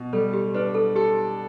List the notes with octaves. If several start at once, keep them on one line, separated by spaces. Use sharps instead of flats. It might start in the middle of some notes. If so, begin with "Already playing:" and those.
Already playing: B2
G3 A4
G4
D4 B4
A4
G4 A4